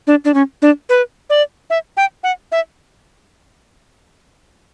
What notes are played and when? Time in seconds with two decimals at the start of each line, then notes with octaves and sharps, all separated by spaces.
0.07 D4
0.25 D4
0.34 C#4
0.62 D4
0.89 B4
1.30 D5
1.70 E5
1.97 G5
2.24 F#5
2.52 E5